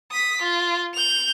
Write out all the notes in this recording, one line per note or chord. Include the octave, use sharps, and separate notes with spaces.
D#6 B6
F4
G6 F7